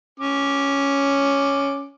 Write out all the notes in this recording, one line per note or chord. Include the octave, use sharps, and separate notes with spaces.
C#4 D6